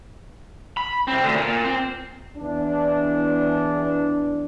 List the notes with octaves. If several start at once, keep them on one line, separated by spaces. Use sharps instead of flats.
B5
C2 C4
D2 D3
A#2
C4
E2 D4